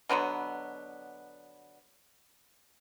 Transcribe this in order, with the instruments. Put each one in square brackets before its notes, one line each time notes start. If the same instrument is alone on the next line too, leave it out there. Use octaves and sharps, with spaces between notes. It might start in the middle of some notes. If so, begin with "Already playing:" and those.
[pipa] B2 D3 F#3 B3